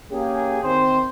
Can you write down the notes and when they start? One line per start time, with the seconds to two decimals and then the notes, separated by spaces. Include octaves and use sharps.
0.11 A#3 C#4 G4 G#4
0.63 D#3 C4 C5